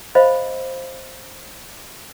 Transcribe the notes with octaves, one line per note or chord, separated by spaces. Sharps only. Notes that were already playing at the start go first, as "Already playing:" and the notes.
C5 D#5 F5 B5